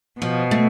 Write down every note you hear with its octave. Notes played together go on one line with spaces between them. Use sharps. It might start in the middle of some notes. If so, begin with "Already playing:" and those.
B2 F3
A3